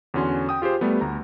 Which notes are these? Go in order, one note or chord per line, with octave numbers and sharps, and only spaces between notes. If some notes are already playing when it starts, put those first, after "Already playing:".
E2 D3 C#4 F#4 C6
G5 D#6
F4 G4 G#4 C5
G3 A3 B3
D2 A#5